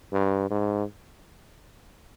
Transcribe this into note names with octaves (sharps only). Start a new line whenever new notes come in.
G2
G#2